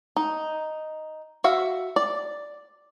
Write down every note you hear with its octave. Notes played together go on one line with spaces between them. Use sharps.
D#4
F#4 E5 F5
D5